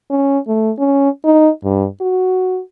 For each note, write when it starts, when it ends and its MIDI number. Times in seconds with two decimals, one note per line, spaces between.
0.11 0.39 61
0.48 0.71 57
0.78 1.09 61
1.24 1.49 63
1.64 1.86 43
2.01 2.60 66